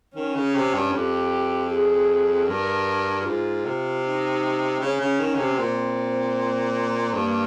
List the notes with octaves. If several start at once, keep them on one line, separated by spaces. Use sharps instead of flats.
D#3 C#4
C#3
C3
G2
F2 G4
G#4
G2 A#4
G#2 F4
C3
D#4
C#3 C#4
C#3
D#3
C#3
C3
A#2 C4
G2 A#3